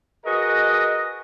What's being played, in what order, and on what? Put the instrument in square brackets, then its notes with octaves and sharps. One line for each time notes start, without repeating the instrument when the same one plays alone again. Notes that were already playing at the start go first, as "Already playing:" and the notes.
[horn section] F#4 G#4 A#4 B4 D#5